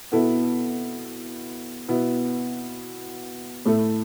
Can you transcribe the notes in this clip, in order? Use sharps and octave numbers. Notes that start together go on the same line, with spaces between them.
B2 B3 E4 A4
B2 B3 E4
A2 A3 E4 A4